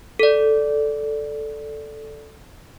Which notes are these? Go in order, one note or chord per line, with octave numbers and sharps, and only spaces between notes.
A4 D5